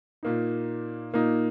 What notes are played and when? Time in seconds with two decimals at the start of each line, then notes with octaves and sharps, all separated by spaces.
0.23 A#2 A#3 D#4
1.14 A#2 A#3 D#4